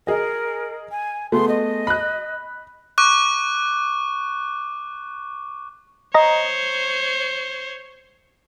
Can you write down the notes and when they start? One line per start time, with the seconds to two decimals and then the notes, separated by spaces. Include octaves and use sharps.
0.07 G#4 A#4 D#5
0.91 G#5
1.32 A3 B3 G#4 C6
1.48 D#5
1.87 B5 F#6
2.98 C#6 D6 F#6
6.14 C5 C#5 D#5 A#5